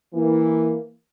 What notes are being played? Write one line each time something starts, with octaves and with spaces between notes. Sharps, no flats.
E3 A#3